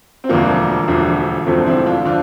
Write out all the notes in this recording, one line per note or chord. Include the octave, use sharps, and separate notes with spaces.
C4
E1 D2 D3 F3 A#3 D4
E1 D2 D3 F3
E1 D2 D3 F3 A3 C4
C4 E4
D4 F4
D3 F3 D4 F4